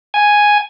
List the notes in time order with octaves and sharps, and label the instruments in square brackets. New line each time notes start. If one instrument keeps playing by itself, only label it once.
[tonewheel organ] G#5